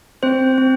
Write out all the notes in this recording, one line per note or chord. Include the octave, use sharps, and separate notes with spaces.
C4 C5
C4